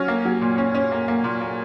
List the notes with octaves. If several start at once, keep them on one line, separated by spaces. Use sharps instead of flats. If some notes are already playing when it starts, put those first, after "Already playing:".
Already playing: F#3 C#4 F6
A#3
F#3
A#2
C#4
C#4
A#3
A#3
A#2
A#3